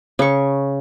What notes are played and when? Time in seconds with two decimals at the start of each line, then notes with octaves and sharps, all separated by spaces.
0.19 C#3 C#6